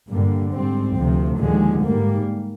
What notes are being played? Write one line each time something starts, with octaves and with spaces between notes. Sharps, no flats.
G2 D3 G3 A#3
G#2 G3 C4
D2 C3 F3
D#2 D3 F3 G#3
G#2 G3 A#3